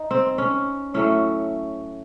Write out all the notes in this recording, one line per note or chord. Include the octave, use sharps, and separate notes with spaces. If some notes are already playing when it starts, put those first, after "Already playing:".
Already playing: D#4
C4
C#4
A2 F#3 A3 C#4